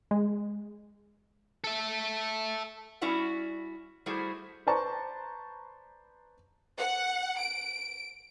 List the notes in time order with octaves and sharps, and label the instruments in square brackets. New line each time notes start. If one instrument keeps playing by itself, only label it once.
[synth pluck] G#3
[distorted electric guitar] A4 E5
[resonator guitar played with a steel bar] G3 C#4 E4 F#4 D5 F#5
G3 A3 E4 F#4 G#4 C5
[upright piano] B4 C5 D5 A5 A#5 C#6
[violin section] F#5
D7